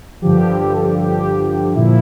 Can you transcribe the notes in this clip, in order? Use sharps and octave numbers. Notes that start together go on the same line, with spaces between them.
G2 D3 F3 G4
G4
A4
G4
F4
G4
A#2 F3 E4